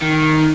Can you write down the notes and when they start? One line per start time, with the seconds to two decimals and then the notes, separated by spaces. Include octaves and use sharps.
0.02 D#3